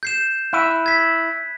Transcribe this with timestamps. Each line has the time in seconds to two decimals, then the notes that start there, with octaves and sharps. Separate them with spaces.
0.03 G6 C7 E7
0.53 E4 F#6 D#7
0.86 G#6 B6